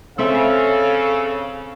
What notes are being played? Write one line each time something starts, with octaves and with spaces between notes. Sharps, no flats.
C#3 C4 A4 C#5 E5 F5